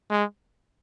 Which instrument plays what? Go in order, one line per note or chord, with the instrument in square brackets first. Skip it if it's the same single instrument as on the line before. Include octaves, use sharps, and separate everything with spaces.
[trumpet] G#3